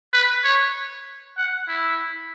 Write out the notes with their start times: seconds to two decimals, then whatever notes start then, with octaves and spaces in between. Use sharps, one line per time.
0.13 B4
0.44 C#5
1.37 F#5
1.68 E4